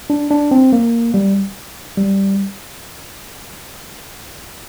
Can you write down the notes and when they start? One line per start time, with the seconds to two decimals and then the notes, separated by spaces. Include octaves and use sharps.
0.10 D4
0.30 D4
0.51 C4
0.73 A#3
1.14 G3
1.97 G3